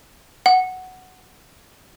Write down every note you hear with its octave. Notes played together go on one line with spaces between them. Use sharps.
F#5